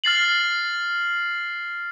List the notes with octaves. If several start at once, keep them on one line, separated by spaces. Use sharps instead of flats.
F6 A6 C7 F#7